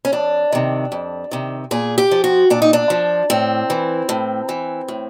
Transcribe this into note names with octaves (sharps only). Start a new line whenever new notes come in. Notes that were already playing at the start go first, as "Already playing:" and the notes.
C#4
F2 D4
C3 D#3
F2
C3 D#3
A#2 G#4
G4
F3
F#4
A#2 D4
D#4
D4
F3
A2 C4
E3
A2
E3
A2